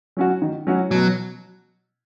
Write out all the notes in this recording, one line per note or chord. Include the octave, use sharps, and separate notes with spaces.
F#3 C#4 F#4
D#3
F#3 C#4 F#4
B2 F#3